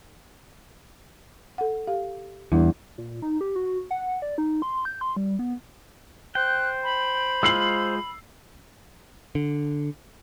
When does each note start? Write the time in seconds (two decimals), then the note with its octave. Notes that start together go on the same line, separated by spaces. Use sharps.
1.58 A4 F#5
1.87 G4 F5
2.52 E2 G3 D4 E4
2.98 A#2
3.22 D#4
3.41 G4
3.56 F#4
3.91 F#5
4.22 D5
4.38 D#4
4.62 C6
4.85 G6
5.01 C6
5.16 G3
5.39 B3
6.35 C5 G5 F#6
6.84 B5
7.43 G#3 F4 E6 C7 F#7
9.35 D3